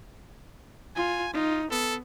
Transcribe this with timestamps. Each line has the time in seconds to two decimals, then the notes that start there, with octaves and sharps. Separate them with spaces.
0.96 F4 G#5
1.33 D#4 F4
1.71 B3 A4